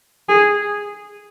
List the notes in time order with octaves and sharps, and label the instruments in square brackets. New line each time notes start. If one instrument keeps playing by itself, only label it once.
[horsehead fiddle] G#4